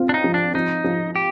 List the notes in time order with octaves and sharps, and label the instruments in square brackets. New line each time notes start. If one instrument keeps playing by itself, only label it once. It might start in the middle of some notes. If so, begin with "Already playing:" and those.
Already playing: [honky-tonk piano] C4 F4
[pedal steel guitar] D4
D#4
[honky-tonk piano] F3
[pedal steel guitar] D4
[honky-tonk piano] F3 [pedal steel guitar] D#4
[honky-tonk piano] F3
[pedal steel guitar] G4